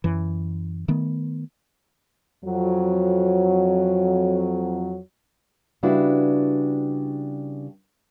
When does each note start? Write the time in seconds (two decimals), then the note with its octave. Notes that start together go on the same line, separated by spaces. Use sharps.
0.04 F#2 E3
0.88 D#3 A3 B3
2.45 F2 F#3
5.83 C#3 G3 D4 E4 F#4 B4